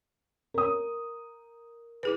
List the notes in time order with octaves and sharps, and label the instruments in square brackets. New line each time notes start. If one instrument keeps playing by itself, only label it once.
[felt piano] A#4 D#6
[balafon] E4 G#4 B4